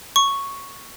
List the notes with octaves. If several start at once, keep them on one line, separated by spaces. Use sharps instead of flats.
C#6